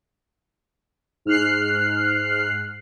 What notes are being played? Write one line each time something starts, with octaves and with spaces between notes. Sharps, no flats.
G#2 F6 F#6 C7